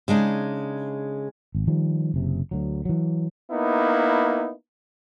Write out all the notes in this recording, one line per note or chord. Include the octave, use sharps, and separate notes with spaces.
C#3 G#3 D4 D#4
G#1
D#3 F3 G3
F#1 C3
D2 F#3
E3 F#3
A#3 B3 D#4 E4